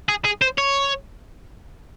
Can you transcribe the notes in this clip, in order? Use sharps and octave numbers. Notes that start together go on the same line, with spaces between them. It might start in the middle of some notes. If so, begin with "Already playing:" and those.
G#4
G#4
C5
C#5